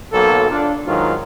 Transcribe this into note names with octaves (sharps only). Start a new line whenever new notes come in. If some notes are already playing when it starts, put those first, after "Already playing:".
B1 F#3 A#3 A4
D4 F4
G#2 D#3 F#3 F4